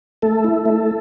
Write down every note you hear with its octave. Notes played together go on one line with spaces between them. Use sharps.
A3 A4
E4
A3